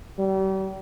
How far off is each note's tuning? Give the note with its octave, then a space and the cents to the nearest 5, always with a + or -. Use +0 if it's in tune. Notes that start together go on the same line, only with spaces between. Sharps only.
G3 -40